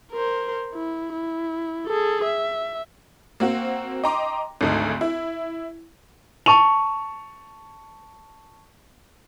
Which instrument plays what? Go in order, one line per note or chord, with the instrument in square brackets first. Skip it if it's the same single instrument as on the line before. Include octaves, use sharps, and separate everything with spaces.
[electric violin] A#4 C5
E4
E4
G#4 A4
E5
[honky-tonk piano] A#3 C4 F#4
D#5 G5 A#5 C6 D6
G#1 D2 D#4
E4
[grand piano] A5 C#6 D#7 F7